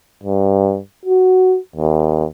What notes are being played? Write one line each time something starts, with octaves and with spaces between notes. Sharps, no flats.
G2
F#4
D#2